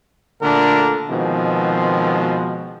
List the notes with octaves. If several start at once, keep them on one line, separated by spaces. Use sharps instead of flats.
A#2 D3 A3 D4 A#4
B2 D#3 F3 G#3 C4